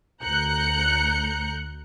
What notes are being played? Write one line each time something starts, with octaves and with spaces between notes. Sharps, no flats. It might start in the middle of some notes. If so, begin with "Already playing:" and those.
D2 A#5 F#6 G6 C#7